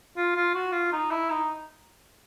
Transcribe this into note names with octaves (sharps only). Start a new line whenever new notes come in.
F4
F4
F#4
F4
D#4
E4
D#4